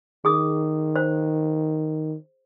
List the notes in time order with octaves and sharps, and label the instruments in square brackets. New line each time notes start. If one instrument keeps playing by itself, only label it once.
[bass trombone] D#3 [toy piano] G#4 D#6
[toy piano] C5